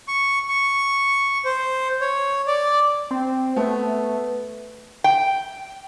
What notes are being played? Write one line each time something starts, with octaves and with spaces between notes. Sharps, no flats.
C#6
C#6
C5
C#5
D5
C4
A3 B3
G5